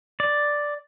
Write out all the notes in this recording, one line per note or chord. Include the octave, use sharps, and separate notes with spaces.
D5